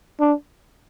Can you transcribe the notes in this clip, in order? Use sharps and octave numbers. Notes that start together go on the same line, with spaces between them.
D4